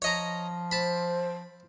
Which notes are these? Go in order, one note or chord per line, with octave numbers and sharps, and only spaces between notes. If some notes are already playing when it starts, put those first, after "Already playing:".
F3 C#5 D#5 A#5
C5 A5 B5